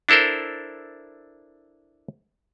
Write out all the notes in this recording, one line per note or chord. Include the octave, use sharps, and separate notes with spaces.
D4 E4 A4 A#4 C5